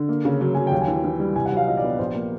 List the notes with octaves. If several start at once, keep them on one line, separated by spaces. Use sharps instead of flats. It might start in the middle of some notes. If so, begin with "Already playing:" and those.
Already playing: D3
A#3
C#3
F#3
F#3 G#5
D#2 G5
G#5
E3
E3
G3
C2 G#5
F#5
F#3 F5
A#2 D#5
D5
B3
A#1 C5
A#3